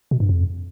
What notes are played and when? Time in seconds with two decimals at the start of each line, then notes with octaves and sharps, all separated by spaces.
0.11 B2
0.20 G2
0.29 F2